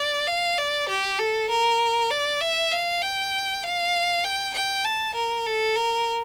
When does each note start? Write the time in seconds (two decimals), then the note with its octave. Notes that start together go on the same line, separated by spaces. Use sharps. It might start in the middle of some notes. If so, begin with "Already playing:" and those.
Already playing: D5
0.27 F5
0.58 D5
0.89 G4
1.19 A4
1.50 A#4
2.11 D5
2.41 E5
2.72 F5
3.02 G5
3.63 F5
4.24 G5
4.54 G5
4.85 A5
5.15 A#4
5.46 A4
5.76 A#4